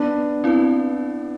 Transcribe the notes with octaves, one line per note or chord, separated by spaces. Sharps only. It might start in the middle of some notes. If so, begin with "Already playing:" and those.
Already playing: B3 D4
C4 E4 B4